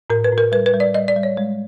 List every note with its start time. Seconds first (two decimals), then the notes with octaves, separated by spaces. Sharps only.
0.10 A2 A#4
0.24 B4
0.32 A2
0.38 A#4
0.52 G3 B4
0.66 B4
0.74 G3
0.80 D5
0.94 G3 D#5
1.08 D5
1.16 G3
1.23 C#5
1.37 G#3